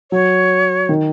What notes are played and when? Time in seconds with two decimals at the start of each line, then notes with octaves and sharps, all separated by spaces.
0.12 F#3 C#5
0.89 D#3